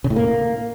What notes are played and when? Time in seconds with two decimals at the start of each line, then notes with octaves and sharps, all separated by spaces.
0.04 C#3
0.10 A2
0.16 A#3